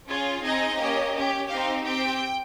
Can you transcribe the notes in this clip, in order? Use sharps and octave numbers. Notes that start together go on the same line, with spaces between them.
C#4 F4 G#4
C4 D#4 G#4 D#5
A#3 C#4 G4
C#4 G4
C4 D#4 G4 F5
C4 G4 G5